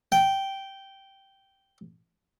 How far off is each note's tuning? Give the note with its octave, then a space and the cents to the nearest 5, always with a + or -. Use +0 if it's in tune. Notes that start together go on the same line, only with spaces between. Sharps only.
G5 -10